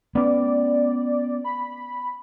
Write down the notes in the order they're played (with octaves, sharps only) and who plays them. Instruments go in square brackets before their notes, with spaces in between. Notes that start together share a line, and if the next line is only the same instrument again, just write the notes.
[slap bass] B3 C#4 [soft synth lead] D5
[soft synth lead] B5